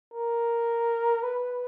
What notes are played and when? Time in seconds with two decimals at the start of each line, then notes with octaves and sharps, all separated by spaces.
0.14 A#4
1.23 B4